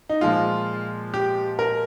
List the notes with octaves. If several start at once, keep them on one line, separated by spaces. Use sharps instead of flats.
D#4
A#2 F3 G#3 F4
G4
A#4